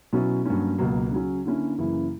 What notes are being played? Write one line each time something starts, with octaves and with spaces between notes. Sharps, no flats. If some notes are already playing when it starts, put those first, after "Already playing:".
B2 F#3 C#4 E4
G2 F#3 A#3 C#4
C#2 B2 F#3 A#3
C#3 F#3 C#4
D3 A#3 C#4 E4
F#2 C#3 E3 A#3 E4